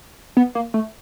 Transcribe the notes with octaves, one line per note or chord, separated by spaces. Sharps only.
B3
A#3
A3